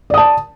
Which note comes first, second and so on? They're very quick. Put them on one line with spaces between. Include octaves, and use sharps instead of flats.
D5 D#6 A5